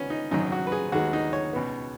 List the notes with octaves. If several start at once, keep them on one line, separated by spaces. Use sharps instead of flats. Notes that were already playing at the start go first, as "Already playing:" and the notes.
Already playing: D#3 B3 C#4
D#4
G#1 F#2 D#3 F#3 D#4
F#4
B4
G#4
D#2 D#3 G#3 B3 F#4
D#4
C#5
C#2 B2 B3